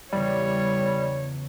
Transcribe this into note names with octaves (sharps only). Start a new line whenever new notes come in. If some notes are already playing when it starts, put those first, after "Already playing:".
E2 C#3 G3 C#5